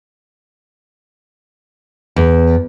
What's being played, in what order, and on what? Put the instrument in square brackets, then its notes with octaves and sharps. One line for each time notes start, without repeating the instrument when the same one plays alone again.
[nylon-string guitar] E2